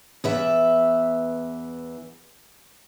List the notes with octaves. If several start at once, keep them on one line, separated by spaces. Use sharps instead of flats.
E2 B4 E5